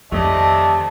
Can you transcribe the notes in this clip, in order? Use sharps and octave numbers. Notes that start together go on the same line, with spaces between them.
F2 C3 D#3 A3 D5 D#5 A5